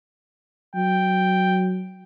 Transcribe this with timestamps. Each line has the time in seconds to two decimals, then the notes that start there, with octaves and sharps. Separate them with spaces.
0.76 F#3 G5